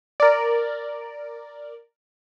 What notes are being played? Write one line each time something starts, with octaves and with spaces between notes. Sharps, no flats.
A#4 D5